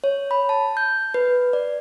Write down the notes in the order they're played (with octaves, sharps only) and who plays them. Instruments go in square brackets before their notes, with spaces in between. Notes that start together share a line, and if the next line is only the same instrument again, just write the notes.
[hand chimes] C#5
B5
A5
G6
B4
D5